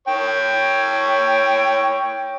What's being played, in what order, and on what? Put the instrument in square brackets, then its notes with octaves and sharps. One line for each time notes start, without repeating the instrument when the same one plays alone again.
[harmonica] C#5 G5